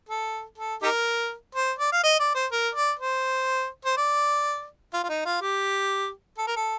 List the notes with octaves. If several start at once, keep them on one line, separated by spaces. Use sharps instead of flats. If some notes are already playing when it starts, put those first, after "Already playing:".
A4
A4
D#4 G4 A#4
C5
D5
F5
D#5
D5
C5
A#4
D5
C5
C5
D5
F4
F4
D#4
F4
G4
A4
A#4
A4